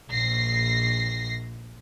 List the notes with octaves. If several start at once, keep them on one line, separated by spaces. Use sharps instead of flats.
A#1 A#6 C7